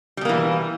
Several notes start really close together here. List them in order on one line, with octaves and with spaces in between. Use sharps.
G3 B2 A#3 E3